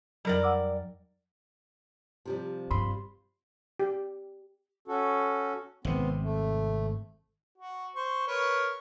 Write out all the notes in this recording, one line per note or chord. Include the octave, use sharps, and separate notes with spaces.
F2 F#3 G3 A#4 D5
F#5 D6 E6
C3 F3 G3
G2 B5 C6
G4
C#4 F#4 A4
G#1 C3 B3 C4
A3
F#4
C5 C#6
A#4 B4 C#5